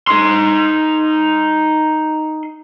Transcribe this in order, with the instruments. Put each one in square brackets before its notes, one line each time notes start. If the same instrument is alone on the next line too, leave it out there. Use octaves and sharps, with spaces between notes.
[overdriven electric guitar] D#4 C6